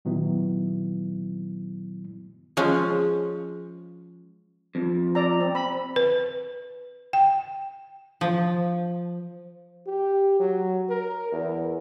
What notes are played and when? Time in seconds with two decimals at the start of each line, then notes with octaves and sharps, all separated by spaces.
0.05 A#2 D#3 F#3 B3 E4
2.57 F3 G#3 C#4
4.75 F2
5.15 D5 A#5
5.40 C4
5.55 B5
5.96 B4
7.13 G5
8.21 F3
9.87 G4
10.40 F#3
10.90 A#4
11.32 E2